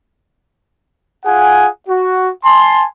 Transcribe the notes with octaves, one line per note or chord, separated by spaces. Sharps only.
F4 G#4 F#5 G#5
F#4
G#5 A5 C6